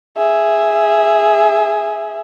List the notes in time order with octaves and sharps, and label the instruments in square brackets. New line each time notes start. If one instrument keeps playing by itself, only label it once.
[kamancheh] G#4 E5